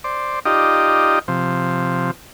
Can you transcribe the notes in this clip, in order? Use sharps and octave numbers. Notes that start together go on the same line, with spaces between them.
C5 D5
D#4 F4 G4 D5 D#5
C3 F3